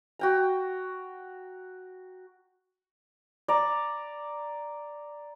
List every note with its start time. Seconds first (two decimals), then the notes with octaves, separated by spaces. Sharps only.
0.19 F#4 G5 A#5
3.48 D5 A#5